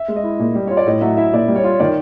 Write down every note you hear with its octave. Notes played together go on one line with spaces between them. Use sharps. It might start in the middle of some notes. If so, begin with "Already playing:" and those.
Already playing: E5
G#3
D#5
E4
A#2
G3
F4 C#5
D5
A2 D#5
F#3 E5
E4 E5
A#2 D5
G3
C#5
F4
D#3 D5